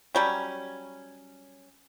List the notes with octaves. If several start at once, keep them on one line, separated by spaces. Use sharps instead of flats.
F#3 G3 C#4